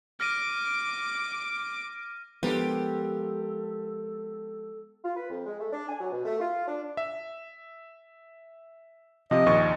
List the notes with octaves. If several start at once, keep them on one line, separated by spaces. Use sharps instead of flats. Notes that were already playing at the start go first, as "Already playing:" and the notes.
D6 F6 A#6 D#7
F3 G#3 B3 D4 F4 G4 A4 A#4
F4
B4
F2
G#3
A3
D4
G#5
F#3
B2
A3
F4
D4
E5
C3 F3 D#5
A#1 D#2 C#6